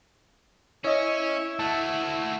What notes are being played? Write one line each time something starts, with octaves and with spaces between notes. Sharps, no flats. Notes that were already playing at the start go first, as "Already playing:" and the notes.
C#4 E4 C#5 D#5
A3 F#4 A5 E6